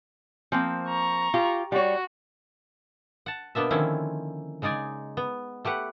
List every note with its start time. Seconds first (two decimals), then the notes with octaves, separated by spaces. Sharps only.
0.52 F3 A#3 C4
0.88 A#5 C#6
1.34 F4 G4
1.72 G3 F#4 C#5
3.26 F#5 A5
3.55 B2 A#3 B3 D4 E5
3.71 D3 D#3 F3 C4 C#4 E4
4.62 C#3 G#3 D#4 D5 G#5
5.17 B3
5.65 A3 G4 B4 F#5